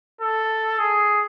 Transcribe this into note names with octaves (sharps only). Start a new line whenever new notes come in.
A4
G#4